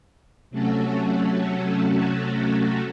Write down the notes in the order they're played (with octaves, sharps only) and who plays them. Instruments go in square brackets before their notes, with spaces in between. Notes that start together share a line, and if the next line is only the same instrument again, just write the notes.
[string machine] C3 F#3 A3 C#4 F#4 A4